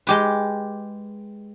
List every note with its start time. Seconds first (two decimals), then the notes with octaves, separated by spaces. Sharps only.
0.07 G#3 G4 B4